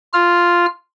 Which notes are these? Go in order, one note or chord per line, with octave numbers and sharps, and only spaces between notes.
F4 F6